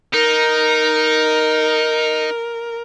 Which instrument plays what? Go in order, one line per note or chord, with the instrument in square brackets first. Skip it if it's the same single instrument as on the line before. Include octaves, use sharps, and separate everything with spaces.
[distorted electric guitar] D#4 [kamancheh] A#4